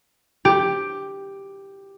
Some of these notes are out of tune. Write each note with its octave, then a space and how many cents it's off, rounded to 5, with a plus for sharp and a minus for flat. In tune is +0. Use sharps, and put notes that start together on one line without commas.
G4 +5